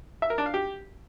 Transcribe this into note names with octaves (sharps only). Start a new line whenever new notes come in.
E5
A#4
D4
F5
G4